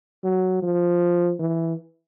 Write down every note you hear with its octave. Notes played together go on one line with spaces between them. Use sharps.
F#3
F3
E3